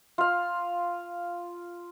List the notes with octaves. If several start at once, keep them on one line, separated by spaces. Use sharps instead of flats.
F4 F5